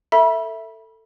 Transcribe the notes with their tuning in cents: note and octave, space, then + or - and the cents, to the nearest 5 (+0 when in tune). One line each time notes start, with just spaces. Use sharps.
A4 +20 E5 +0 B5 -30